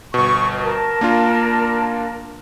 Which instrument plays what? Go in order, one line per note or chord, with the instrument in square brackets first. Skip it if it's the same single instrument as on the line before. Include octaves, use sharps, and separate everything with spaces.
[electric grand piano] G1 B2 [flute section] C#6
[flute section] A#4 A5
[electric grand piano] A#3 D4 F4